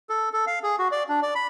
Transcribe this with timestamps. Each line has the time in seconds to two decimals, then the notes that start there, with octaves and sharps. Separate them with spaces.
0.09 A4
0.33 A4
0.47 F5
0.63 G#4
0.79 F#4
0.92 D5
1.09 D4
1.22 D5
1.35 B5